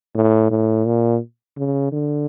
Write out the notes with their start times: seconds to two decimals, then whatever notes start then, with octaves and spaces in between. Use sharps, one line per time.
0.15 A2
0.50 A2
0.86 A#2
1.57 C#3
1.92 D3